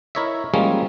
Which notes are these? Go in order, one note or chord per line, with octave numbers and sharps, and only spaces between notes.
E4 A#4 C#5 D#5 E5
F3 G3 G#3 A#3 C#4 G#4